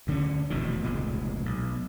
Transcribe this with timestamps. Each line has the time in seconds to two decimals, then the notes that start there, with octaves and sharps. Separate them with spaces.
0.07 D2 D3 G3 C#4
0.50 F1 E2 B2 D#3
0.84 F1 C#2 A#2 G#3
1.46 B1